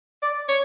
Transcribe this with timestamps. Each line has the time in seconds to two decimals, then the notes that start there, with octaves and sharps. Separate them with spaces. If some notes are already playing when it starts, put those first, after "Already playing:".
0.22 D5
0.48 C#5